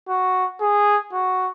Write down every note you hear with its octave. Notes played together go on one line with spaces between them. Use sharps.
F#4
G#4
F#4